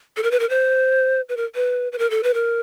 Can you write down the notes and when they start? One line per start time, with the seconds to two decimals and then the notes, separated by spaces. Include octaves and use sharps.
0.17 A4
0.23 A#4
0.31 B4
0.40 A#4
0.50 C5
1.29 B4
1.37 A#4
1.55 B4
1.92 B4
1.99 A#4
2.10 A4
2.23 B4
2.34 A#4